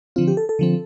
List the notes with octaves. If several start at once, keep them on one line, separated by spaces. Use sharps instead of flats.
D3 F3 C4 F4
G4
A4
A4
D3 F3 C4